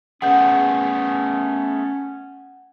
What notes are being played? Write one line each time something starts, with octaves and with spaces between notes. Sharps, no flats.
A3 B3 C#4 G#4 F#5 G6